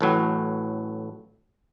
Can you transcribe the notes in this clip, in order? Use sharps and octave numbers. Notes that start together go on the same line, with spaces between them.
A1 A2 F#3